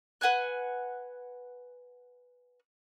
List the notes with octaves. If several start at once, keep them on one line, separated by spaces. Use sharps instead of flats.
B4 F#5 G#5 F#6